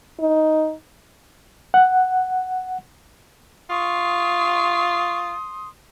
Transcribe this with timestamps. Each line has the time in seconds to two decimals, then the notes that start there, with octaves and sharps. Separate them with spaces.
0.20 D#4
1.74 F#5
3.70 F4 C6 C#6 D#6